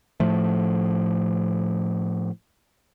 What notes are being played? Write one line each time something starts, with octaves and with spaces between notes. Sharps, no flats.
A2 F3 A3